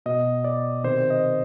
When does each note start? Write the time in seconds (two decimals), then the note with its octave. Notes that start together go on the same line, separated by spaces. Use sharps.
0.06 B2 D#5
0.44 D5
0.84 C3 D#3 C5
1.10 D#5